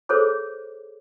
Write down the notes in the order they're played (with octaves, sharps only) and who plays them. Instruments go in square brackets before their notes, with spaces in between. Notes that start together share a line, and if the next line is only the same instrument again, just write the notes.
[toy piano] G#4 A4 C5 C#5 D6